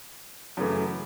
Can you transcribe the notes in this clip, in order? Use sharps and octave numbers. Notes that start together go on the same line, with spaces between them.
F#2 C#3 E3 A3